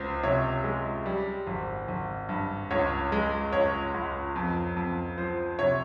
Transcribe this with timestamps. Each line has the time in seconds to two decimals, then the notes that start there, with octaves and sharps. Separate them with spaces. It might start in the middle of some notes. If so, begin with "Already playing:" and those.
Already playing: C#2 C5
0.23 C3 C#5
0.64 G#3
1.06 G3
1.47 G#1
1.88 G#1
2.29 G2
2.71 C#2 C#5
3.12 G#3
3.53 C#2 C#5
3.94 C#2
4.36 F2
4.77 F2
5.18 F3 C5
5.59 C3 C#5